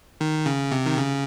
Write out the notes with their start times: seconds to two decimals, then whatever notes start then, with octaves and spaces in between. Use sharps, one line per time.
0.21 D#3
0.46 C#3
0.71 C3
0.86 D#3
0.97 C#3